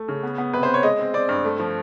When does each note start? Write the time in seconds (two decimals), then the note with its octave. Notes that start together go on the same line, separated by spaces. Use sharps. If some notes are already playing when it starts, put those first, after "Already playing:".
Already playing: A3
0.08 C#3
0.23 B3
0.38 B3
0.53 C3 B4
0.63 C5
0.68 B3
0.74 C#5
0.83 G#3 D#5
0.99 C4
1.14 C4 D5
1.29 G2
1.44 A3
1.59 F3